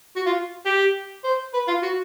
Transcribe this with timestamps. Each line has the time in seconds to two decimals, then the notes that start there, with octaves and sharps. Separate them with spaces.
0.16 F#4
0.26 F4
0.66 G4
1.24 C5
1.54 B4
1.68 F4
1.83 F#4